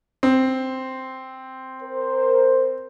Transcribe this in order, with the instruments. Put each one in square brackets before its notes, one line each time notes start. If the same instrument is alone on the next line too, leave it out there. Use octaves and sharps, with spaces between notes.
[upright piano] C4
[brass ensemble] A#4 C5